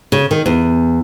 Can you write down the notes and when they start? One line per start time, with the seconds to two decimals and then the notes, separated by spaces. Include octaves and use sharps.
0.12 C#3
0.31 D#3
0.46 E2